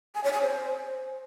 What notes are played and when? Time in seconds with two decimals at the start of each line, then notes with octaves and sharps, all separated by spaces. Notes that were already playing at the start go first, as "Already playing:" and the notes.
0.15 G#5
0.24 C#5
0.33 G#5
0.42 C5